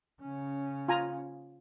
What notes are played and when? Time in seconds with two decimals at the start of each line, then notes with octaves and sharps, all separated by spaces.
0.21 C#3 C#4
0.88 F4 G#5 A#5